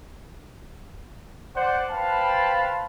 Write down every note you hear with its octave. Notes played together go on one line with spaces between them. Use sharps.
C5 D5 F#5
B4 C5 F5 G5 A5 B5